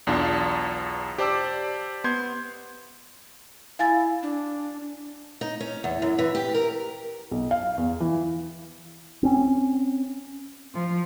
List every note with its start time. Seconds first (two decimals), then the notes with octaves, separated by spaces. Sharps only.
0.07 B1 E2 D4 F4 A5
1.18 G4 C5 D5 A5 D6 E6
2.04 B3 C6 G6 G#6
3.79 E4 F5 G#5 A6
4.23 D4
5.41 D#4
5.60 C#4
5.84 E2
6.02 F#2
6.19 E3
6.35 G4
6.54 A#4
7.31 B1
7.51 F5
7.78 E2
8.00 E3
9.23 C4 C#4
10.74 F3